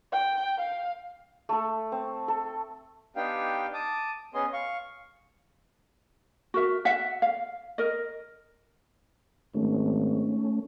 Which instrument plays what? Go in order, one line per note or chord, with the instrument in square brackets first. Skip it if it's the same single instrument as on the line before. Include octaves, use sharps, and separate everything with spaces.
[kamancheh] G5
F5
[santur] A3 A4
C4
A4
[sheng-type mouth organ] B3 D4 D#4 G4 F5 G5
A5 D6 D#6
B3 C#4 G#4 D#5 C6
F5 C#6
[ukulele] F#4 A#4 E5
E5 F#5
F5
A#4 D#5
[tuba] G#1 [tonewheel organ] A3 C#4